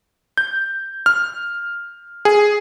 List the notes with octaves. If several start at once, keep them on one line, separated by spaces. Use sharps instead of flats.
G6
F6
G#4